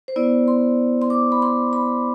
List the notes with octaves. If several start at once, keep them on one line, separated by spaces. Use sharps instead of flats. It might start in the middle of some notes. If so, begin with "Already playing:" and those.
C5
B3 E4 D5
C6
C6
D6
B5
C6
B5